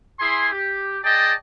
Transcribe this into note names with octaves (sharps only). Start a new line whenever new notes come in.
E4 G#4 G#5 C6
G4
G#4 D5 D#5 G5 A5